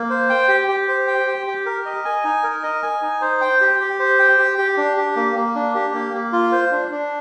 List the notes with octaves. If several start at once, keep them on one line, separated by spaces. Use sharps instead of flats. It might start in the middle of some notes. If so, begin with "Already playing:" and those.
Already playing: A#3
C5
G5
G4
G4
C5
G5
G4
G4
A#4
D#5
G#5
D#4
A#4
D#5
G#5
D#4
C5
G5
G4
G4
C5
G5
G4
G4
D4
G4
A#3
A#3
D4
G4
A#3
A#3
F4
C5
D4
D4